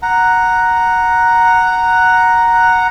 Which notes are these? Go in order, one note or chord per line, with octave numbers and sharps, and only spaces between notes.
F#5 A#5